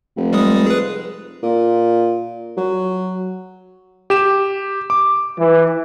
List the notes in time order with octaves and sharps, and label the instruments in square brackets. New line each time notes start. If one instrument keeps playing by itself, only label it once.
[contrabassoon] F1
[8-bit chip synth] G3 G#3 D#6
G#4 B4
[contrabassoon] A#2
F#3
[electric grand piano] G4 E7
D6
[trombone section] E3